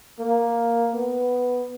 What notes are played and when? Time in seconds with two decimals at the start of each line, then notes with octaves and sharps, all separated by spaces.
0.20 A#3
0.94 B3